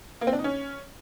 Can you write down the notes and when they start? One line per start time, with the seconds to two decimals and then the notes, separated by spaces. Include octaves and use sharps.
0.21 A#3
0.27 C4
0.33 D4
0.39 D#4
0.44 C#4